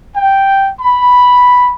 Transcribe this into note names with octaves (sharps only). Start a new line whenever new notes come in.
G5
B5